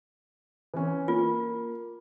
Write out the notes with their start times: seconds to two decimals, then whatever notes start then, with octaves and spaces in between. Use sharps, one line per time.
0.74 E3 C4 C#4
1.08 A#3 F4